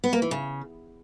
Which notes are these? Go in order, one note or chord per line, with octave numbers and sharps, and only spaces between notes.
B3
A#3
E3
C#3